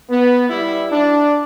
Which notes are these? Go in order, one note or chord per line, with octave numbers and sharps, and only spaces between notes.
B3
G3 E4
D4